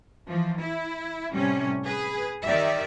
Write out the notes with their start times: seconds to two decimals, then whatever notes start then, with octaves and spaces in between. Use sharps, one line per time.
0.28 E3 F3
0.59 E4
1.34 A2 C3 G3 C#4
1.84 G#4 B4
2.44 D#3 G4 D5 E5